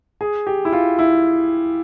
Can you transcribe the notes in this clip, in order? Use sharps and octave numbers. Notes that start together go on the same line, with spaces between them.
G#4
G4
E4
F4
E4